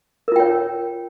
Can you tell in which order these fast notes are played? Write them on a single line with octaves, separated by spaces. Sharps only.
A#4 F4 G5 C#5